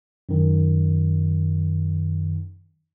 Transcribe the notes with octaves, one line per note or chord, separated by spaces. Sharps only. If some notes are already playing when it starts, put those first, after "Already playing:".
F#2 D#3